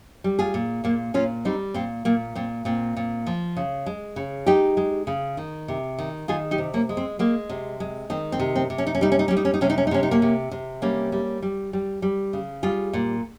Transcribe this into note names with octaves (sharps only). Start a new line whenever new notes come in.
G3
F4 G#4
A#2
A#2 A#3
A#2 C#4 F4
G3 C4 D#4
A#2 C4
A#2 A#3
A#2 C4
A#2 C4
A#2
F3
C#3
G#3
C#3
G#3 D#4 G4
G#3
C#3
D#3
C3
D#3
D#3 F4 G#4
D#4 G4
C3
A#3 C#4
G#3
C4
G#3 A#3
C3
G#3
D#3 C4
C4
C3
C4
C3
C#4
D#4
C#4
G3 D#4
C#4
D#4
G3 C#4
D#4
C#4
D#4
C3 C#4
D#4
C#4
D#4
C3 C#4
D#4
A#3 C#4
C3
C3
G3 A#3 C#4
G3
G3
G3
G3
C#3
G3 F4 G#4
A#2